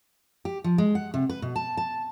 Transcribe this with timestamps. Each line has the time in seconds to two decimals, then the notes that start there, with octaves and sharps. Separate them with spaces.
0.45 G4
0.64 F3
0.78 G#3
0.95 F#5
1.14 C3
1.30 B4
1.42 B2
1.56 A5
1.77 A5